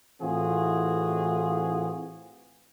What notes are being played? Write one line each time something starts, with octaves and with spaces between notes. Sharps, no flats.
A2 E3 C4 F4 F#4 G#4